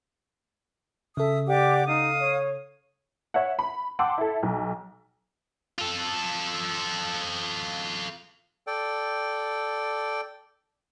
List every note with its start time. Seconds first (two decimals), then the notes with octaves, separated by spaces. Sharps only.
1.17 C#3 A4 E5 D#6
1.48 G4 D5 F#5 D6
1.87 D#4 F5 D#6
2.20 C#5
3.34 C#5 E5 F#5
3.59 B5
3.99 F#5 G5 A5 C6 D6 E6
4.18 E4 A4
4.43 B1
5.79 F4 A4
8.67 A4 D5 G5